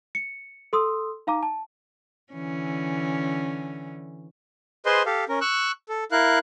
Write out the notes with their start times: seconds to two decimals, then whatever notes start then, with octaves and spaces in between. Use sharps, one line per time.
0.15 C#7
0.73 A4 C6 D#6 E6
1.27 D#4 F5 A#5 D6
1.43 A5
2.33 D3 E3 C#4
4.86 G#4 B4 C5 D#5 C6
5.06 G4 A4 F5
5.29 C#4 A#4
5.41 C#6 E6 F#6
5.89 A4
6.12 E4 A#4 F5 F#6